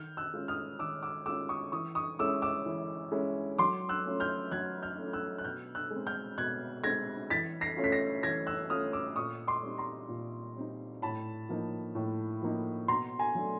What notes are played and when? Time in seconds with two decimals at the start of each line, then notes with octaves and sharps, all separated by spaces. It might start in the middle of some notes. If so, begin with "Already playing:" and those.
Already playing: D#3 F6 G6
0.17 E6 F#6
0.34 G#3 C#4 F4
0.48 D#6 F6
0.79 D#3 D6 E6
1.03 D6 E6
1.26 G#3 C#4 F4 D6 E6
1.49 C#6 D#6
1.72 E3 C#6 D#6
1.95 C#6 D#6
2.19 G#3 C#4 E4 D6 E6
2.42 D6 E6
2.66 E3
3.12 G#3 C#4 E4
3.58 F#3 C6 D6
3.89 E6 F#6
4.06 A3 C#4 F4
4.20 F6 G6
4.52 F#3 F#6 G#6
4.83 F6 G6
4.98 A3 C#4 F4
5.13 E6 F#6
5.38 F#6
5.44 B2 F6 G6
5.75 E6 F#6
5.91 G#3
5.96 C4
6.07 F6 G6
6.38 B2 F#6 G#6
6.84 G#3 C4 G#6 A#6
7.30 E3 A6 B6
7.61 A#6 C7
7.77 A3 C#4 F4
7.84 B6
7.92 A#6 C7
8.23 E3 G#6 A#6
8.47 E6 F#6
8.70 A3 C#4 F4 D#6 F6
8.93 D6 E6
9.16 A#2 C#6 D#6
9.48 C6 D6
9.63 G3 C4 D#4
9.78 A#5 C6
10.09 A#2
10.55 G3 C4 D#4
11.02 A2 A5 B5
11.49 F3 A#3 D#4
11.95 A2
12.41 F3 A#3 D#4
12.88 B2 A#5 C6
13.19 G#5 A#5
13.35 F#3 A3 D4